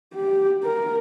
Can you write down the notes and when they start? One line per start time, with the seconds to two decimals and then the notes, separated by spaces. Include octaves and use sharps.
0.14 G4
0.63 A#4